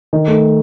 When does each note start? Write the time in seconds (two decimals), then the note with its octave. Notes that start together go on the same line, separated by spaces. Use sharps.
0.13 D#3
0.28 A3